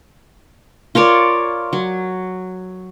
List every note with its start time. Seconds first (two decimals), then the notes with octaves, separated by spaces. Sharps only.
0.95 F4 A#4 C#5 D5
1.73 F#3